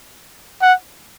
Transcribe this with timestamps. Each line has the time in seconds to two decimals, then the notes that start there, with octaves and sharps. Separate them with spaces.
0.62 F#5